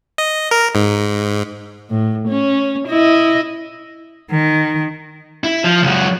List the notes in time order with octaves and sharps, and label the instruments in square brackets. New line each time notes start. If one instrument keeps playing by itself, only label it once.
[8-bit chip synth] D#5
A#4
G#2
[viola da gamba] A2
C#4
E4 D#5
[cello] D#3
[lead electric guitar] E4
F3
C#2 F#3